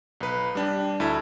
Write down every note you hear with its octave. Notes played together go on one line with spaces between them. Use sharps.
B1 B4
G3 D4 G4
D2 E4 A4 E5